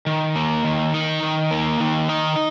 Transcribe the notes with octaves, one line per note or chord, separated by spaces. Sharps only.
D#3
A#3
D#3
D#4
D#3
A#3
D#3
D#4